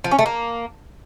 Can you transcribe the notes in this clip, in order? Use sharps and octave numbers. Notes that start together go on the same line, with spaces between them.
F3
C#4
A3
A#3